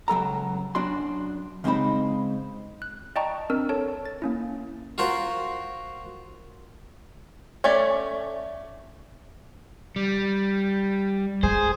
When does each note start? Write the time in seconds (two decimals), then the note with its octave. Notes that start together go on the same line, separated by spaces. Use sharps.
0.08 C#2 F#3 A4 A#5
0.75 F#2 D4 F#4 C6
1.64 C#3 G#3 C4 D#4 C5 B5
2.82 F#6
3.16 D5 D#5 G5 A5 A#5 C#6
3.50 C4 D4 A#4 E6
3.69 A4 C#5 A5
4.06 A6
4.22 A#3 C#4 E4
4.98 F4 F#4 A#4 C5
7.64 A3 C#4 C#5 D5
9.96 G3
11.43 G#3 G#4 C5